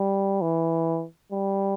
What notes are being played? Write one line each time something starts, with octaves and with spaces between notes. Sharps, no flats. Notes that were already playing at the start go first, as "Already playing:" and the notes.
Already playing: G3
E3
G3